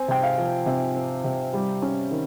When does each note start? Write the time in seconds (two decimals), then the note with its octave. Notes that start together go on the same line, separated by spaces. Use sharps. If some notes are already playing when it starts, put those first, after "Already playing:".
Already playing: C4 G#5
0.08 C3 G5
0.23 F5
0.38 F3
0.66 C3
0.95 C4
1.24 C3
1.54 G3
1.82 C#4
2.11 D#3